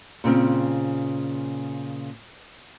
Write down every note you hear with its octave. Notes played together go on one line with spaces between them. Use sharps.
A#2 C#3 C4